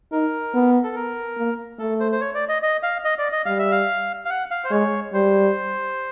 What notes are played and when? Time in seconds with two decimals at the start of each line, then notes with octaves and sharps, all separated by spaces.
0.12 D#4 A#4
0.54 B3
0.84 A4
0.96 A#4
1.38 A#3
1.79 A3 A4
2.00 C5
2.12 C5
2.21 C#5
2.35 D5
2.49 D#5
2.62 D#5
2.83 F5
3.05 D#5
3.18 D5
3.32 D#5
3.46 G3 F5
3.59 E5
3.71 F5
4.25 F5
4.30 F#5
4.51 F5
4.64 C5
4.71 G#3 C#5
5.13 G3 C5